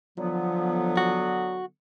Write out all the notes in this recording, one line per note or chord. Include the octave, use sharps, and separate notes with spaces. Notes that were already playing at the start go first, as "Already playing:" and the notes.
D3 F3 F#3 B3
F#4